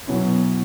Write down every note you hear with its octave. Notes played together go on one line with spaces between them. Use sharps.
B2 F#3 C#4 E4